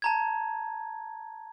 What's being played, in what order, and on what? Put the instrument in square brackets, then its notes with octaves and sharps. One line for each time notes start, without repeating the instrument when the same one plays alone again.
[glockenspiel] A5 A#5 G#6